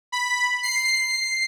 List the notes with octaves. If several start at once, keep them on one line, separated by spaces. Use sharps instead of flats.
B5
C7